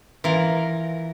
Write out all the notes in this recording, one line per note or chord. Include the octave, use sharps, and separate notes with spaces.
E3 F4 A#4